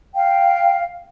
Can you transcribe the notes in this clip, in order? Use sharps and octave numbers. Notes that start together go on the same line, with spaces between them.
F5 G5